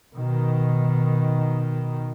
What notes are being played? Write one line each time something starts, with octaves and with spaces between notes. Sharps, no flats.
B2 D#3